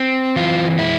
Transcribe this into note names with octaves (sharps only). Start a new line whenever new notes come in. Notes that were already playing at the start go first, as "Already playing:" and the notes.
Already playing: C4
E3 F4
G#3 E4